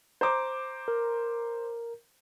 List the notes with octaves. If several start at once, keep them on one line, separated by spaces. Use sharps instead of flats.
C5 A#5 D6
A#4